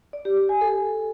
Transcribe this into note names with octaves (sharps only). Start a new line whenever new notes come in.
D5
G4
G4
G#5
A4